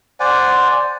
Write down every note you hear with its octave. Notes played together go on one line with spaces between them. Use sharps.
C5 D5 F#5 G#5